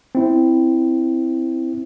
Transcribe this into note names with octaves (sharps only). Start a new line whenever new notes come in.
C4 E4